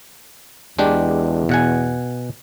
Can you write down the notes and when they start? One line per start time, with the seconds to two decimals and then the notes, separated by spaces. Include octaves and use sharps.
0.79 E2 G#3 D4 G4
1.49 B2 F#5 G#5